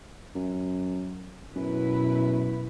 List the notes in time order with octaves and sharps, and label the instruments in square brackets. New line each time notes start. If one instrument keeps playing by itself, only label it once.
[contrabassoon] F#2
[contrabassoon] F#2 [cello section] B2 E4 B4